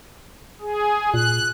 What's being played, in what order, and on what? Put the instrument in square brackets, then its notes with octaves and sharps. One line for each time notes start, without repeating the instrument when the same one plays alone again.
[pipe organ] G#4
[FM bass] A#2 [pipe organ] F#6